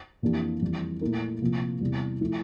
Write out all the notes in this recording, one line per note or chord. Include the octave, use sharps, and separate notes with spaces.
F2 E3 A#3 D4 G4
F2 E3 G3
A#2 A3 E4 A#4
C3 F3 A#3
E2 C3 E3 G3
F3 A3 E4